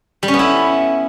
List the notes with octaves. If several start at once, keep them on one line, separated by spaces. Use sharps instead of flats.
G3
C#4
B3
E4